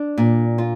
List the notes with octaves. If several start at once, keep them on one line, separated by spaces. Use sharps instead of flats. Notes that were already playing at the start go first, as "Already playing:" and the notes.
Already playing: D4
A#2
F4